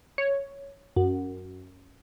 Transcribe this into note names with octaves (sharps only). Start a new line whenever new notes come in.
C#5
F#2